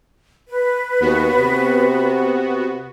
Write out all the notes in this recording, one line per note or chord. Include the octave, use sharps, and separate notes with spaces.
B4
D#2 B3 F#4
C3